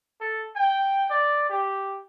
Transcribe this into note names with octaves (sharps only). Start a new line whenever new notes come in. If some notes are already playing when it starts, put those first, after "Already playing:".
A4
G5
D5
G4